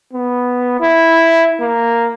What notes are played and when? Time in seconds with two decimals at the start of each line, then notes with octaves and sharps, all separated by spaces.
0.13 B3
0.81 E4
1.61 A#3